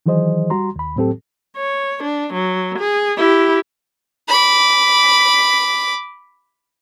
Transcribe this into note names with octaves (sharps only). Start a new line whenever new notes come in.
D#3 E3 F#3 G#4 C5 D#5
G3 F#4 A#5 C6
D#2 B5
A2 F#3 C4 G4 A4
C#5
D4
F#3
G#4
E4 G4
B5 D6